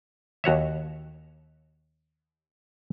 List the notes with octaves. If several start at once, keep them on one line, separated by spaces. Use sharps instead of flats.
D#2 F#4 C#5 E5